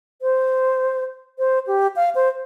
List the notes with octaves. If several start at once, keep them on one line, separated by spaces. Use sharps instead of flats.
C5
C5
G4
F5
C5